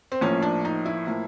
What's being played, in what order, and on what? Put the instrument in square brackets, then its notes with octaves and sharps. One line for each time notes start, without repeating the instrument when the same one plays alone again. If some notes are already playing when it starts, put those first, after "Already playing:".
[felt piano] C4
A#1 A2 F3 A#3 C#4
D4
D#4
E4
A2 F3 A#3